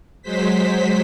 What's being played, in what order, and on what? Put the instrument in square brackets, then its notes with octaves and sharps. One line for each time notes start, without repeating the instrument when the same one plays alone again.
[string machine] F#3 G#3 C5 B6